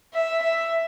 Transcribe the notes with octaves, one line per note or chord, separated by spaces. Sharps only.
E5
E5